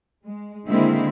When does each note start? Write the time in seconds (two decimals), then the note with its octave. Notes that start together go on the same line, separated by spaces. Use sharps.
0.25 G#3
0.68 D3 D#3 G#3 A#3 C4 E4